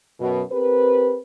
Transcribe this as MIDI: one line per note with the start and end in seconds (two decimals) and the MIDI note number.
0.20 0.42 42
0.20 0.42 47
0.52 1.18 60
0.52 1.18 67
0.52 1.18 70
0.52 1.18 71